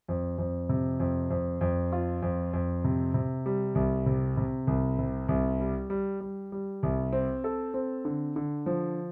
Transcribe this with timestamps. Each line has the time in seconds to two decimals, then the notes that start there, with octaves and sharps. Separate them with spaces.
0.08 F2
0.38 F2
0.69 C3
1.00 F2
1.30 F2
1.61 F2
1.92 F4
2.22 F2
2.53 F2
2.84 C3
3.14 C3
3.46 G3
3.75 C2
4.06 C3
4.37 C3
4.67 C2
4.99 C3
5.29 C2
5.60 G3
5.90 G3
6.21 G3
6.52 G3
6.83 C2
7.13 C4
7.44 A4
7.74 C4
8.05 D3
8.36 D3
8.66 F3